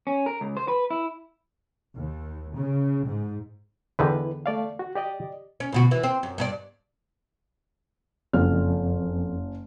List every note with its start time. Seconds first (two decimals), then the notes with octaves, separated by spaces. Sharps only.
0.07 C#4
0.26 A#4
0.41 C#2
0.57 C5
0.68 B4
0.91 E4
1.95 D#2
2.55 C#3
3.05 G#2
3.99 E2 D3 D#3 E4 B4
4.46 A3 D5 F5
4.79 F#4
4.95 G4 D5 D#5
5.60 C#4
5.72 D2 B2 F#4
5.91 E3
6.03 C4
6.23 F#2
6.38 G2 D4 D5
8.33 F#1 F2 F6